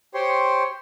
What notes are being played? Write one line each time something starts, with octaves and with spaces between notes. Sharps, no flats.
G4 C5 C#5 C6